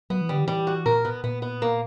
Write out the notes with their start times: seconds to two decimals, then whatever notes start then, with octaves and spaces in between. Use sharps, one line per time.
0.10 F#3 B3
0.21 E3
0.29 D3 G3
0.43 E3 G3
0.67 F#4
0.86 A#2 A#4
1.05 B3
1.24 A#2 B3
1.42 B3
1.62 A#3